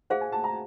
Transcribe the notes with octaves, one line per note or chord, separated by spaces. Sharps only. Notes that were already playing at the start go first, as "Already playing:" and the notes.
G#4 C5 F5 F#5
G#5
A5
A#5